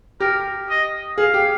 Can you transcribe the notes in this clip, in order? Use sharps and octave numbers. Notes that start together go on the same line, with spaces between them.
G4 A#4
D#5
G#4 F5
G4